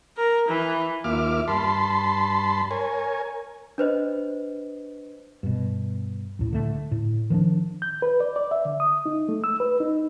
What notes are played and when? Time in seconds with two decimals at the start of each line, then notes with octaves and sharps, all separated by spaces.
0.17 A#4
0.48 E3
1.04 D#2 A#3 F4 E5 D6 F6
1.48 G2 A5 B5 C6
2.71 A#4 C#5 G#5
3.78 D4 B4 C5 D#5
5.43 G2 B2
6.39 C#2 A2
6.53 D3 A3
6.91 A2
7.30 D#3 F3 A3 D4
7.82 G6
8.02 B4
8.20 D5
8.36 D5
8.51 E5
8.65 D3
8.80 D#6
9.06 D#4
9.29 A3
9.44 E6
9.60 B4
9.80 D#4